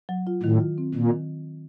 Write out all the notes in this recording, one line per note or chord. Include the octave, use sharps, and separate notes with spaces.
F#3
F4
A2 D#3
F4
C4
A#2 D#3
D#3